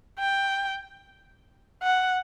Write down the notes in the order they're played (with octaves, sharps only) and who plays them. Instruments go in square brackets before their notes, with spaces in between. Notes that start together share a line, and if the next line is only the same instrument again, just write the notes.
[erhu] G5
F#5